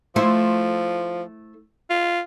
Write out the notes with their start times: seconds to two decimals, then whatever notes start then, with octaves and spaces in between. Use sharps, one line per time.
0.16 F3 A3 E4 C5
1.90 F4